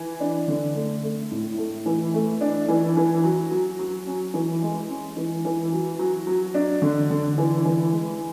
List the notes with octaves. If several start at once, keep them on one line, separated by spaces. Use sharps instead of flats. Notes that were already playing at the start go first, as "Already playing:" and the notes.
Already playing: E3
D4
D3
A3
A3
A2
A3
E3
A3
D4
E3
E3
F#3
F#3
F#3
C#4
E3
G#3
C#4
E3
E3
F#3
F#3
F#3
D4
D3
D3
E3
E3
G#3